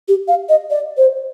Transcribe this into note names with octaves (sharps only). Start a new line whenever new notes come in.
G4
F5
D#5
D5
C5